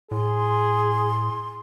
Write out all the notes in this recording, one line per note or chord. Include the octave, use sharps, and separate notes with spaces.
A2 G#4 C6